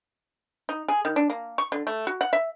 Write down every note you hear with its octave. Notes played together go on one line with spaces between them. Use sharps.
D#4
G#4
D#3
D4
A#3
C#6
D3
A3
F#4
F#5
E5